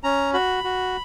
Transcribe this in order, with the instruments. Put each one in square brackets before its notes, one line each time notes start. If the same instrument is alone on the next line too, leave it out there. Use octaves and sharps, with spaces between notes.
[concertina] C#4 A#5
F#4 B5
F#4